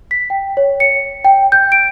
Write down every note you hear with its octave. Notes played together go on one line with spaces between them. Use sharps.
B6
G5
C#5
C#7
G5
G6
D7